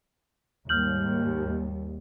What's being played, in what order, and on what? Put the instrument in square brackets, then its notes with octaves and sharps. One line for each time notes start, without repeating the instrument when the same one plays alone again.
[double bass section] D#2 G#2 G3 [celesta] F6 G6 F#7